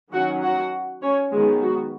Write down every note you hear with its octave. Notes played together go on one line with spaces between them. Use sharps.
D#3 F#3 C#4 F#4 F#5
F#4 F#5
C#4 C#5
D#3 F#3 G#3 B3 G#4
F#4